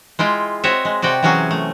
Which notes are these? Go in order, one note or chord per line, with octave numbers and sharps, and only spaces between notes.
G#3 E4 F4 G5
C4 F#4 C#5 D#5 E5
G#3
C3 F#4 D5 G5
C3 E3 F#3 C#4 F#4 G#4
A3